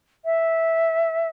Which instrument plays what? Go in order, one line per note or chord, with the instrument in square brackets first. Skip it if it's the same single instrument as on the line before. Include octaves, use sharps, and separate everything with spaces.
[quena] E5